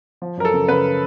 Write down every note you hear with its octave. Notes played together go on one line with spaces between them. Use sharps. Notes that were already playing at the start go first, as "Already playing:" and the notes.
F3
F#2 A#4
A4
C#3
C#3 B4